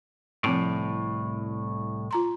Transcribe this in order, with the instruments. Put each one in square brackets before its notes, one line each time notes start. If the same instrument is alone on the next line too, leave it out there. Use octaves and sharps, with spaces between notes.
[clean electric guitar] C2 A2 [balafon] F3 C4 A5
[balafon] F4 A#5 C6